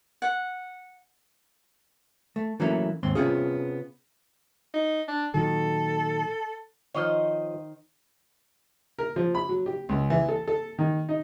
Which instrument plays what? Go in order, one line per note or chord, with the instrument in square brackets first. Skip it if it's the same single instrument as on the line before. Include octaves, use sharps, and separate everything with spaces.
[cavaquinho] F#5
[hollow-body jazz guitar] A3
E3 F#3 A3 A#3 C#4 E4
D#2 G#2 C4 C6
C3 A#3 B3 C#4 F4 G#4
[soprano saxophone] D#4
D4
[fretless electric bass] A#2 D#3 F#3 [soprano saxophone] A4
[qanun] D#3 C5 D#5 [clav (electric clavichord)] F3 C#5
[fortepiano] A#4
F3
B5
F#3
G4
C#2
E3
A4
A4
D#3
D#4